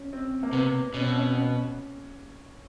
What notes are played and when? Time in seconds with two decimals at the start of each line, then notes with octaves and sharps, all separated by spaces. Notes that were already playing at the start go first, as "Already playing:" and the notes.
Already playing: C#4
0.13 C4
0.43 A#3
0.53 C3 B3
0.94 B2 C#4
1.03 C4
1.13 C#4
1.34 C#4